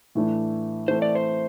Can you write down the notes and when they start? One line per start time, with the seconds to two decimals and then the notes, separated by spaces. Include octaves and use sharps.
0.15 A2 E3 A3 D4
0.88 E3 A3 C4 C5
1.02 D5
1.15 C5